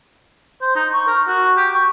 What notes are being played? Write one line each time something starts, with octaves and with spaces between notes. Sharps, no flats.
C5
D#4
C#6
A#4
F#4
G4
C#6